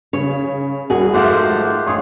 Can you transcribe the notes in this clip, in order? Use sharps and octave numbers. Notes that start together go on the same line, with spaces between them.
C#3 C#5
C2 F#4 G#4
G#1 F3 A3 A#3 G4 C5 F#5
A1 F4 G#4 C#5 C6